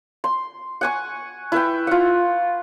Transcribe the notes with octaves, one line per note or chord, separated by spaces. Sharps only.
C6
F#5 G#5 C#6
E4 B4 G5
F4 F#5